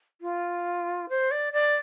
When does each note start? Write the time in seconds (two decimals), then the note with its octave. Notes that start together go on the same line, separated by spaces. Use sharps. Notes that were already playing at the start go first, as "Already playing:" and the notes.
0.21 F4
1.09 C5
1.31 D5
1.53 D5